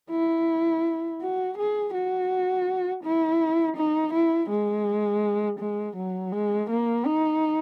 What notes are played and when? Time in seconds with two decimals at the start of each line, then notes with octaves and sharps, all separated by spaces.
0.11 E4
1.21 F#4
1.58 G#4
1.94 F#4
3.03 E4
3.77 D#4
4.14 E4
4.50 G#3
5.59 G#3
5.97 F#3
6.33 G#3
6.70 A#3
7.06 D#4